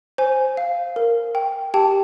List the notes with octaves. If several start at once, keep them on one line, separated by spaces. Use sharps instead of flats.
C5 G#5
F5
A#4
G5
G4 G5 A5